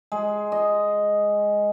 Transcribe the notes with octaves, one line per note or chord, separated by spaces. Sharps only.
G#3
D#5